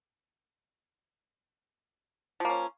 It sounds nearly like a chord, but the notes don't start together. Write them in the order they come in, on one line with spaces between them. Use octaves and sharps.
F3 A#3 C#4